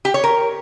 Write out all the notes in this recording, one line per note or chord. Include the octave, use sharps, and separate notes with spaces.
G4
C#5
A#4